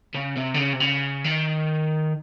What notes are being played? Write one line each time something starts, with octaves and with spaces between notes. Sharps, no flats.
C#3
C3
D3
C#3
C3
C#3
D#3